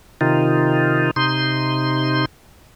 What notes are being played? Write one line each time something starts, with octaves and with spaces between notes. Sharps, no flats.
C3 D#3 D#4 F4
C3 D#4 C6